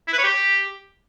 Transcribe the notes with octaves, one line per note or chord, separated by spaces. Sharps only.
E4
B4
C#5
G4